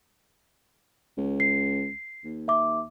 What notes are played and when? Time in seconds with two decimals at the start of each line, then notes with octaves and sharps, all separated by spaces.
1.17 C#2
1.40 C7
2.24 D#2
2.48 E5 D6